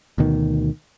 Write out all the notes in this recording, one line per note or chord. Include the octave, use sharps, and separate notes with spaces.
D2 B2 D#3